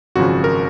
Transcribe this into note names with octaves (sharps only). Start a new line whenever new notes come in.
G#1 F#2 C#3 F3 F#4
A#4